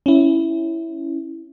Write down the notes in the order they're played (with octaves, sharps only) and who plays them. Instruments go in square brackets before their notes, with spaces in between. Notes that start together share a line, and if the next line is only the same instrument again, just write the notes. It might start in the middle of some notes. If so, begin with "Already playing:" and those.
[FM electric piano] C#4 E4